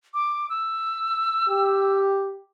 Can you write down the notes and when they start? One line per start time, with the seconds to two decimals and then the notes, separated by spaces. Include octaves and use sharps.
0.14 D6
0.50 E6
1.49 G4